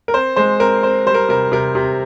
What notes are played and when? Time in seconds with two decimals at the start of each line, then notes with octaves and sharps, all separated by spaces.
0.08 A#4
0.14 C4 C5
0.36 G#3 C5
0.60 C4 A#4
0.83 C4 C5
1.06 G3 C5
1.14 A#4
1.29 C3 A#4
1.52 C3 A#4
1.75 C3